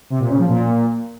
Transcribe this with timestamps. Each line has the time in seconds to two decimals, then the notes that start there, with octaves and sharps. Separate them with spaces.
0.10 C3
0.20 A#2
0.30 C#3
0.39 F3
0.49 A#2